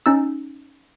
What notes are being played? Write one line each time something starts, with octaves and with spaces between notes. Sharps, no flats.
C#4 D#4 E6